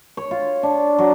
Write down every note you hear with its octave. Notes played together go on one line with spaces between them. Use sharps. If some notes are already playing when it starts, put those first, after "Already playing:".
C#5
F4
D4
F#3